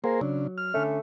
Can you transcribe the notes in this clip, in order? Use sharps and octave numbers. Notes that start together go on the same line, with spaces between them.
A#3 G#4 A#4 C5
C#3 F#3 D4
F6
D3 A3 C#4